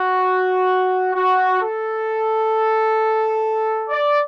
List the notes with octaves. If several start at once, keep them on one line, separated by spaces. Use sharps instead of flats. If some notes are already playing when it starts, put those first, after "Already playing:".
Already playing: F#4
F#4
A4
D5